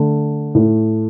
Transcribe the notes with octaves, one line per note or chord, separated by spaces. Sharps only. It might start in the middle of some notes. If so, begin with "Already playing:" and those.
Already playing: D3 A3
A2 A3